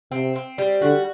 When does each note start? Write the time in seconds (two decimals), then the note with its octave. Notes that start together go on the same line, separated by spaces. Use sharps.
0.11 C3 C4
0.35 C4
0.58 G3
0.82 D3 F#4